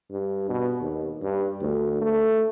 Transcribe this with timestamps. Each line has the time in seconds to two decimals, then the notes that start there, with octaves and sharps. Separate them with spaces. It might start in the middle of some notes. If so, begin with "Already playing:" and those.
0.11 G2
0.49 B2
0.81 D#2
1.22 G2
1.61 D2
2.01 A3